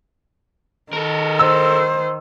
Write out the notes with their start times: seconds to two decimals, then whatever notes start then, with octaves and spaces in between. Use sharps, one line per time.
0.93 D#3 A4 A#4
1.39 C5 E6